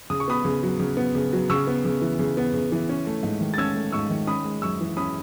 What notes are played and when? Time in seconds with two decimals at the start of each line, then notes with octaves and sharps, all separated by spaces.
0.10 C#3 D#6
0.20 C#6
0.28 B3 B5 D#6
0.45 C#3
0.63 F#3
0.80 C#3
0.97 B3
1.15 C#3
1.33 F#3
1.50 C#3 C#6 E6
1.67 B3
1.85 C#3
2.02 E3
2.19 C#3
2.37 B3
2.53 C#3
2.72 E3
2.89 C#4
3.07 A3
3.23 G#2
3.41 D#3
3.54 A6
3.58 C#4 E6 G#6
3.76 A3
3.92 G#2 C#6 E6
4.10 D#3
4.27 C#4 B5 D#6
4.45 G#3
4.62 F#2 C#6 E6
4.81 E3
4.97 C#4 B5 D#6